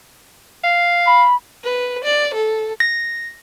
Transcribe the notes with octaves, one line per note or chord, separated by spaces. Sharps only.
F5
B5
B4
D5
A4
A#6